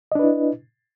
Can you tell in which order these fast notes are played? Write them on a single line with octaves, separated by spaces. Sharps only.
D#5 D4 B4 E4